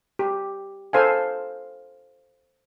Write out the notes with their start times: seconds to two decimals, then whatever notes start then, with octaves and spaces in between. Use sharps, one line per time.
0.19 G4
0.93 A4 C5 F5 G#5